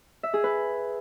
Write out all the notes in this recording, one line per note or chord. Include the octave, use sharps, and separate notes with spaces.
E5
G#4
B4